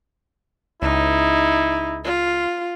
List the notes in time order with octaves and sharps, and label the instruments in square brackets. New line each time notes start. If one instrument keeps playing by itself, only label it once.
[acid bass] C#2 [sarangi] D#4 [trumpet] E4
[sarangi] F4